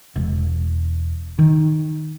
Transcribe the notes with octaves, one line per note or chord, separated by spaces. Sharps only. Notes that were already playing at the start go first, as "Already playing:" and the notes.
E1
D#3